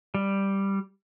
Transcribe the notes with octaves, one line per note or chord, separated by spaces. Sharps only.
G3